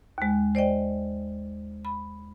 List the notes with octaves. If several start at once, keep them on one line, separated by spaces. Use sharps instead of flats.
D#2 G#3
C5 D5 D#5 G5
B5